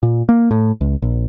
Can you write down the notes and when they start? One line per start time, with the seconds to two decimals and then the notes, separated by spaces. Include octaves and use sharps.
0.03 A#2
0.29 A#3
0.51 A2
0.81 C#2
1.02 A#1